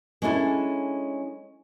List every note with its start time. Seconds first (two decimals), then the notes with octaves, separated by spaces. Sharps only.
0.22 G#3 C#4 D4 E4 A4